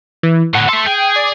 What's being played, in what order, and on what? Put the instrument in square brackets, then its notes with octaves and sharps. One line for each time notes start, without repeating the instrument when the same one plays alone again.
[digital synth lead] E3
[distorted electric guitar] A2 D3 [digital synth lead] F#5
[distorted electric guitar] A3 A4 [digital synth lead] C6
[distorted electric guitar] G#4 [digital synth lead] G5
[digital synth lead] D5